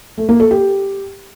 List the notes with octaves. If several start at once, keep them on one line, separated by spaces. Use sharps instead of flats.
A3
A#3
A4
G4